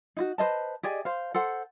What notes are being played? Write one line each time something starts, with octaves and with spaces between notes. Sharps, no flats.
D#4 E4 F#4
B4 C5 D#5 A5
G4 G#4 D5 D#5
C5 F5
A4 C5 F#5